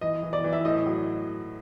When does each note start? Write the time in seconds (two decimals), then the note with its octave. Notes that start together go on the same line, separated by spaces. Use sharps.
0.01 E3 D#5
0.23 E3
0.33 D5
0.44 E3
0.53 E5
0.65 A2 D#5
0.86 F#3